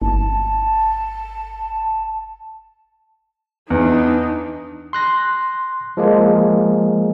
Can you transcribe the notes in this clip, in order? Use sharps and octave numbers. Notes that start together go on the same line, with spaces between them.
G1 A5
E2 D4 D#4
C6 F#6 A#6
F3 G#3 A#3